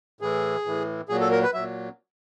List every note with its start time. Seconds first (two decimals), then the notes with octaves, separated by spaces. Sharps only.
0.21 A2 E3 G#4
0.66 A2 E3
1.09 A#2 F#3 G#4
1.20 A4
1.31 A#4
1.43 B4
1.54 A#2 F#3 E5